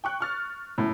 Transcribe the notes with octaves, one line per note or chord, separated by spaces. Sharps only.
G5 C#6 F#6
C#6 F6 A6
C#2 F#2 A2